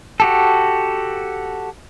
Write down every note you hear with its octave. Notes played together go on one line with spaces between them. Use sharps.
F#4 G4 A4